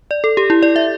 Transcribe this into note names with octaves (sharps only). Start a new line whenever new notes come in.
D5
A4
G4
E4
D5
E5